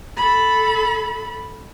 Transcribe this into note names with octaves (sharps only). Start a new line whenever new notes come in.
A4 B5